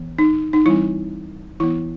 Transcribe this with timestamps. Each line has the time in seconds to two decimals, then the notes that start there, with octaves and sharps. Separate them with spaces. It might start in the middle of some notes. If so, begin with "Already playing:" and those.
Already playing: E3 B3
0.19 D#4
0.53 D#4
0.65 E3 G3 C4 E4
1.60 E3 B3 E4